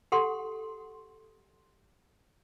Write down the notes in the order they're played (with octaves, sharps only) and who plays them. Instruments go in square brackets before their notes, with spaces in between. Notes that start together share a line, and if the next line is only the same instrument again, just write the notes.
[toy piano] G4 A4 F#5 C6